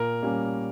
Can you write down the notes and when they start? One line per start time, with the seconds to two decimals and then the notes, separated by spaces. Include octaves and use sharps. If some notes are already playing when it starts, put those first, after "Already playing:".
Already playing: A#2 A#4
0.22 G3 A#3 C#4